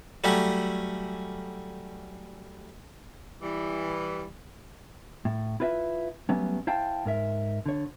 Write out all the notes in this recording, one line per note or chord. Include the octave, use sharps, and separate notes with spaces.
F#3 G3 A3 C#4
E3 G3
A2
E4 F4 B4 D5 E5
F#3 G3 A3 B3 C#4
E4 C5 F5 G5 A5
G#2 A#4 E5
D3 C#5